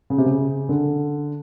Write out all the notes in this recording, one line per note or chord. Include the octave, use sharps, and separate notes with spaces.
C#3
C3
C#3
D3